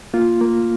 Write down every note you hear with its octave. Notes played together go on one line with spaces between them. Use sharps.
A#3 F4
A#3